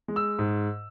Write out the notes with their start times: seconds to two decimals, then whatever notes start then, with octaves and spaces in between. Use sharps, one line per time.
0.08 G#3
0.16 E6
0.39 G#2